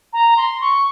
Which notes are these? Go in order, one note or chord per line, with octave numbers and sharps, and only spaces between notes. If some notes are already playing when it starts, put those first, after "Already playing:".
A#5
C6
C#6